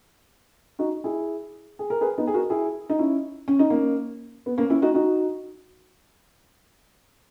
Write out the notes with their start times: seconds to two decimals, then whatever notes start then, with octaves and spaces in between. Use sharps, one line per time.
0.79 D#4 F#4
1.04 E4 G#4
1.79 G#4
1.90 A#4
2.01 G#4 B4
2.18 B3 D#4
2.27 G#4
2.34 F#4 A#4
2.50 E4 G#4
2.89 D#4
2.99 C#4 E4
3.48 C#4
3.59 D#4
3.70 A#3 C#4
4.46 B3
4.58 A#3 C#4
4.70 C#4 E4
4.82 D#4 F#4
4.94 D#4 F#4